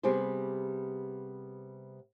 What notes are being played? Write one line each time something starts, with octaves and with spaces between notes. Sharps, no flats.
C3 G3 B3 G4 G#4 C5